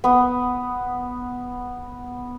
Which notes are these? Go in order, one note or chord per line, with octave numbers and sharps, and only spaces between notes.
B3 D#6